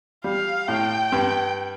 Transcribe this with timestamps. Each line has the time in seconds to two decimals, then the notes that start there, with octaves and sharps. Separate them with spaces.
0.24 G3 F5
0.68 A2 G5
1.12 G2